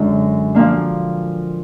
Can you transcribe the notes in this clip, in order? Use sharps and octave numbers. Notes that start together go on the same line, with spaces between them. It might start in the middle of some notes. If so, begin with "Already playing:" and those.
Already playing: F#2 D3 G#3 D4
A#2 F3 A#3 D4